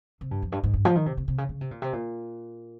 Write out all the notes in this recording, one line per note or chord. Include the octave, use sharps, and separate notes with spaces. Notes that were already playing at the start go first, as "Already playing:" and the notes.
C3
G2
F2
G2
G#2
G2
F3
D#3
C3
C3
C3
C#3
C#3
C3
A#2
C3
A#2